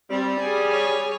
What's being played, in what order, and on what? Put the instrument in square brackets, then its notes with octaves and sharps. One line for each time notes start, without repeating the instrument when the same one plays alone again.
[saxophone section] G3 [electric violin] C4
[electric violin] G#4 G#5
[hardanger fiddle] C#5